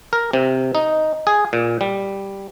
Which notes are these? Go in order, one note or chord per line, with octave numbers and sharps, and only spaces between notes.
A#4
C3
D#4
G#4
A#2
G3